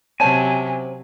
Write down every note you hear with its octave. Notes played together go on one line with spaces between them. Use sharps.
C3 F#3 C#4 C5 G#5 A5